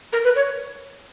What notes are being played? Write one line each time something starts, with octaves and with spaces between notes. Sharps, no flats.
A#4
B4
C#5